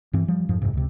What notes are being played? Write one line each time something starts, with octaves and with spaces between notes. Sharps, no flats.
G2 E3 C4
F3 G3
F2 G#2 F3
F2 G#2 C3
C#2 C3